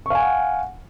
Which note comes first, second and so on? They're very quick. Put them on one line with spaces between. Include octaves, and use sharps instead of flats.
C#6 F5 G#5 F#5